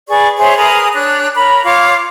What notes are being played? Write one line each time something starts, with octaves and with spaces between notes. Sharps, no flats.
G#4 B4 D5 C#6
G#4 C5 C#5 E5
G#4 A#4 B4 D#6
D4 C#5 F#6
A#4 C#5 B5
F4 C#5 F5 D6